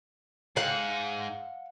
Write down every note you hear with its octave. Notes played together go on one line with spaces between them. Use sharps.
G#2 F5 F#5